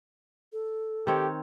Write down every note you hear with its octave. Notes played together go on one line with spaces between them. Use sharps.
A4
D#3 C4 G4 C#5